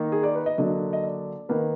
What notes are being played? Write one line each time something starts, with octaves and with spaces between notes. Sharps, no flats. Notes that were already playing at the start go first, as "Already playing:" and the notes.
Already playing: D#3 A#3 D#4
G#4
D5
B4
D#5
D3 F#3 A#3 D4 D#5
D#5
D5
D#3 A#3 B4